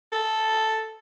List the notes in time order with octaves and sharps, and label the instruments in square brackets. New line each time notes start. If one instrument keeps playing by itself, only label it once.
[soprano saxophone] A4